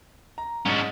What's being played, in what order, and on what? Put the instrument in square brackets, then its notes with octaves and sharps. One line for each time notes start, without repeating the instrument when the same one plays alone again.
[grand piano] A#5
[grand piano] G#2 [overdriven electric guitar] C#4 D4